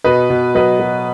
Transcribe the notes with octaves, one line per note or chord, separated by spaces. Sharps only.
B2 B4 D#5
B2
F#3 B4 D#5
F#3